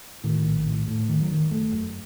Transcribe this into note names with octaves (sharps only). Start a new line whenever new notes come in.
A2 D#3
A#1
A2
A2
F#1 D#3
F#3
F#1 D#3
F#1 A3
F#2